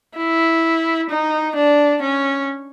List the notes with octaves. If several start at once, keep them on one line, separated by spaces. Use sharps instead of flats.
E4
D#4
D4
C#4